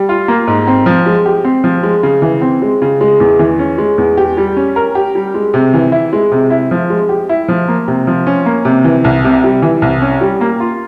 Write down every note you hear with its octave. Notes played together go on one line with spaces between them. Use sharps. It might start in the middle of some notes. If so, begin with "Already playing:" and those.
Already playing: G3
F4
A#3
G#2
C4
F3
G#3
G4
C4
F3
G#3
C#3
E3
C4
G#3
C#3
G#3
E2
E3
C#4
G#3
E2
G4
G3
C#4
A#4
G4
G3
G#3
C3
E3
E4
G#3
C3
E4
F3
G#3
G4
E4
F3
A#3
C3
F3
C#4
A#3
C3
E3
C2
C3
G3
E3
C2
C#4
G3
A#3
F4